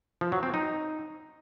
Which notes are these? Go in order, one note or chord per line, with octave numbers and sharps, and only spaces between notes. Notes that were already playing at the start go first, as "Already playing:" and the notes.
F3
F#3
C4
D#4